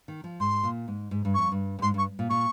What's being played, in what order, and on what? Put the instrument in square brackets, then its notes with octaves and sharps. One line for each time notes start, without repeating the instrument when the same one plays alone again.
[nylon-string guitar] D#3
F3
[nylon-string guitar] G#2 [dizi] C6
[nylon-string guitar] A#2
G#2
G#2
G2
[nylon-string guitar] F2 [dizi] C#6
[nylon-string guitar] G2
G2
[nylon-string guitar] G#2 [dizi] C6
[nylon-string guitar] G2 [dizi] C#6
[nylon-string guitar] A#2
[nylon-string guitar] A#2 [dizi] C#6